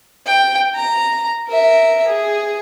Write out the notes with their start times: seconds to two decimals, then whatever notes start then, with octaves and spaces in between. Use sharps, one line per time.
0.26 G5
0.75 A#5
1.48 A#4 E5
2.07 G#4